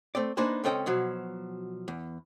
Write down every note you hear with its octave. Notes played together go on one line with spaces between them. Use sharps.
A3 C4 D5
A#3 D4 D#4 B4 C5 G#5
C#2 C4 C#4 A4 D#5 G5
B2 F3 F#3
E2